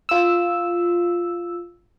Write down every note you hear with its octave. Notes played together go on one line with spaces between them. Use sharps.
F4 E6